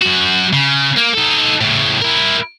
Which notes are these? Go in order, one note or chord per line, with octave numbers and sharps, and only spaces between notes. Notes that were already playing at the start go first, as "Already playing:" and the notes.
F#2 F#4
C#3
A#3
D#4 A4
A2 C#3
E4 A#4